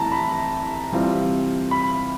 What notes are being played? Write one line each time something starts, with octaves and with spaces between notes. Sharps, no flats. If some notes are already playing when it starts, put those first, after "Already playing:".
Already playing: C2 C3 E3 A3 A5 A#5
B5
C3 E3 G3 C4 F4
B5